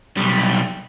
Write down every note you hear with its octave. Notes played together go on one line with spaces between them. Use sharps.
B1 G3